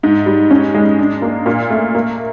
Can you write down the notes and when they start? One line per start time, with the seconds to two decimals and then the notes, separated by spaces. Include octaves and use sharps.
0.03 G#2
0.26 G3
0.51 C#4
0.74 G#3
0.99 D4
1.22 A#3
1.46 A#2
1.70 A3
1.95 A#3